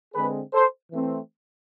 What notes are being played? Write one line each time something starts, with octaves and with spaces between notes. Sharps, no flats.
D3 G#3 C4 G#4 B4
A4 C5
E3 A3 C4